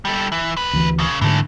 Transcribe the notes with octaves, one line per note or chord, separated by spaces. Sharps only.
G3 A4
E3
C2 B4
D2 E3
A#2 C#3
G#2 D3 E3 A3